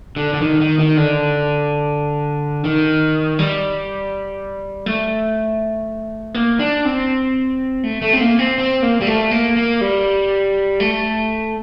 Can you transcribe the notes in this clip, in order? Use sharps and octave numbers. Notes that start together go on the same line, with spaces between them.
D3
D3
D#3
D#3
D#3
D3
D#3
G3
A3
A#3
D4
C4
A3
A3
C4
A#3
C4
C4
A#3
G3
A3
A#3
A#3
G3
A3